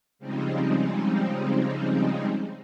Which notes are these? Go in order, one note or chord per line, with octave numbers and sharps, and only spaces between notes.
C#3 F3 G3 G#3 C4 D#4